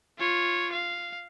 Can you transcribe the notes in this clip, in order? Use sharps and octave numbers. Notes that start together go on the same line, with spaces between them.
F4 C#5
F5